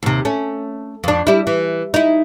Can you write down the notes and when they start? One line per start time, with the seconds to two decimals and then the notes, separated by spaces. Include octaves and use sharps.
0.03 D#2 C3
0.25 A3 C#4
1.04 F2 D4
1.27 G3 E4
1.47 E3
1.94 D#4 E4